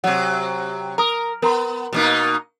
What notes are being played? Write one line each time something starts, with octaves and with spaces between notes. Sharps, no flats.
C3 F#3 F#5
A#4 A#5 D#6
B3 A#4 A#5 C6
B2 A#3 D#4